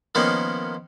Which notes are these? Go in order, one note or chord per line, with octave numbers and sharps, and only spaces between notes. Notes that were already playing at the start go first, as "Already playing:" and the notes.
D#3 F3 A#3 B3 C#4